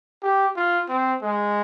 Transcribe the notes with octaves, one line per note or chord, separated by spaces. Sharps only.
G4
F4
C4
G#3